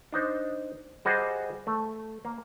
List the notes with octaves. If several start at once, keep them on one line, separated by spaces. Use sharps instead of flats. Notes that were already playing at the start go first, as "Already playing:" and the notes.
D4 D#4 C5
G3 F#4 G#4 C5 D#5 F#5
A3
A#3